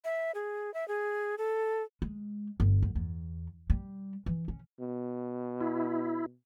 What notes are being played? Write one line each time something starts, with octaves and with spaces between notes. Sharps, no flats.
E5
G#4
E5
G#4
A4
G#3
G1
F#2
E2
G3
E3
C#4
B2
E4